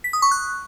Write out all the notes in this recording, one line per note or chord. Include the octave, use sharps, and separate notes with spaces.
B6
D#6
C#6
F#6